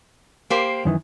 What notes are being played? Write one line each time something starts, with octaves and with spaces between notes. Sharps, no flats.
A#3 G4 C5
F#2 D#3 E3